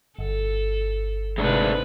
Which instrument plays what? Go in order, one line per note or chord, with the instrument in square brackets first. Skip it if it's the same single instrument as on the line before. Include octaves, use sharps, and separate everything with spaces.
[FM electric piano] G1 [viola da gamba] A4
[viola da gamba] G#2 C3 B4 [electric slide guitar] G#3 A3 D4